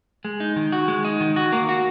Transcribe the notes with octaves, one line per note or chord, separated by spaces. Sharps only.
G#3
D#4
D#3
F#4
G#3
D#4
D#3
F#4
A#3
F#4